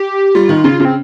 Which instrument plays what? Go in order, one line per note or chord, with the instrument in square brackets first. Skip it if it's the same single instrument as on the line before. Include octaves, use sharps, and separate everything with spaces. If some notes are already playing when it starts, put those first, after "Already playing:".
Already playing: [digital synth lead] G4
[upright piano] G3 [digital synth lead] F4
[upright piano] D#3
[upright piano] C#3 [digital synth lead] F4
[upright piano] C#3
[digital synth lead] C4